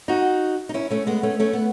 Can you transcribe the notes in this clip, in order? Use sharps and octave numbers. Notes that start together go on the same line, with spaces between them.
D#4 F#4
D#4
C#4 E4
A3 C#4
G#3 B3
A3 C#4
A3 C#4
B3